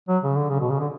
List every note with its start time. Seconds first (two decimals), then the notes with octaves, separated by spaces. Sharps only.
0.08 F#3
0.23 C#3
0.35 D3
0.50 C#3
0.60 B2
0.70 C#3
0.80 D3